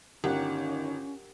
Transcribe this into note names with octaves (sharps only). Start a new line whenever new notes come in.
G1 D#3 C#4 G4 A#4 F#5